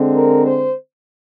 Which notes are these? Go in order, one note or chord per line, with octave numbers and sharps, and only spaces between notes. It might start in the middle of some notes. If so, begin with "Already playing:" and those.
Already playing: D3 G#3 C4
A#4
C5